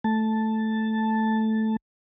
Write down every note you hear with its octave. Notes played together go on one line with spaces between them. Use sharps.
A3 A5